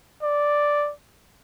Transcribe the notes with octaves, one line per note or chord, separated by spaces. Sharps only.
D5